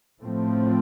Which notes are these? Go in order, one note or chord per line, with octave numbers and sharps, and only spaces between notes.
A2 F3 A3 C4